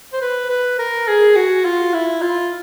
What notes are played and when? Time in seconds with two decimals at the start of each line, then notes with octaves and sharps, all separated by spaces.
0.13 C5
0.22 B4
0.50 B4
0.79 A#4
1.08 G#4
1.36 F#4
1.65 F4
1.94 E4
2.22 F4